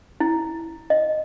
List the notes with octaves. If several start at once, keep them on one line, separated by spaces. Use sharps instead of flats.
E4
D#5